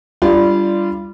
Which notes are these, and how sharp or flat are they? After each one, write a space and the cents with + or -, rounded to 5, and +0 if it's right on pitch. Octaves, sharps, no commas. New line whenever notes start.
G3 +5 D4 +0 F4 -25